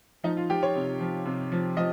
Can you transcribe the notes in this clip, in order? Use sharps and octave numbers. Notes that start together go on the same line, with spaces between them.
F3 D#4
F4
F3 G4
C#5
C3
F3
C3
F3
F3 D#5